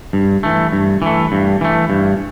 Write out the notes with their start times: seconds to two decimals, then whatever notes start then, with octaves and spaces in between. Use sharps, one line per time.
0.13 G2
0.43 E3 A3
0.73 G2
1.02 E3 A3
1.32 G2
1.61 E3 A3
1.90 G2